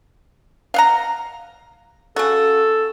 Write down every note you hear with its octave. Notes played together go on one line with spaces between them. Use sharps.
F5 F#5 A#5
C#3 F#4 A4